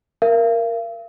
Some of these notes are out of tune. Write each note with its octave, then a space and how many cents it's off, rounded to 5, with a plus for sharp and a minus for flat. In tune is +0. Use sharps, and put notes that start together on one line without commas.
A#4 +0 F5 -40